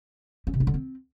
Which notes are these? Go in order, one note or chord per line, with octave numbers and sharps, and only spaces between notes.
C#4
C3
D4
D3
C4